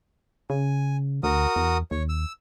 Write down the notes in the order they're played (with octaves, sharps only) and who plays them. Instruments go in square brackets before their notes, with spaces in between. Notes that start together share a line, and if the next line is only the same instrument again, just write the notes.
[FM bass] C#3 [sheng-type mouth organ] G#5
[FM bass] D2 [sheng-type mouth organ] F#4 A#4 D#6
[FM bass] E2
[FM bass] D#2 [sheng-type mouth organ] C#5
[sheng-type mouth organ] E6